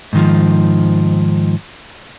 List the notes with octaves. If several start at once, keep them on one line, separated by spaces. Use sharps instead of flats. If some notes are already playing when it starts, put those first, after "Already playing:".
G#2 D#3 F3